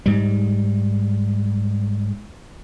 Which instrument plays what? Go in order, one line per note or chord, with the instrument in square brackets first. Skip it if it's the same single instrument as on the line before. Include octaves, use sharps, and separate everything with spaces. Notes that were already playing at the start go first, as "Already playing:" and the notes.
[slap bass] G#2 G3